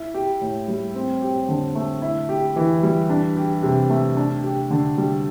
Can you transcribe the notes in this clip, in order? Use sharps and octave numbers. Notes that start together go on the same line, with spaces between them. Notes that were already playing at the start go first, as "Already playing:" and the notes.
Already playing: E4
G4
A2
G3
C4
G4
D3
A3
E4
G4
E3
G3
D4
G4
C3
A3
D4
G4
D3
G3